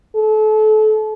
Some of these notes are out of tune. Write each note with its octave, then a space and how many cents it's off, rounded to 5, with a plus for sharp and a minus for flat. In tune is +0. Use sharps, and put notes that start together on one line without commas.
A4 -30